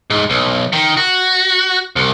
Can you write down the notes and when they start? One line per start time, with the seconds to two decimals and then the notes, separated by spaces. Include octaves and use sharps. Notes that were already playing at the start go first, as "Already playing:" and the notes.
0.10 G#2
0.30 B1
0.73 D#3
0.97 F#4
1.96 C2